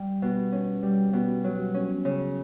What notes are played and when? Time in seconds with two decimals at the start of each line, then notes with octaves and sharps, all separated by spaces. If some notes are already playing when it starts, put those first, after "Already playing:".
Already playing: G3
0.22 B2
0.52 C#4
0.83 G3
1.13 B2
1.44 F#3
1.74 C#4
2.05 C#3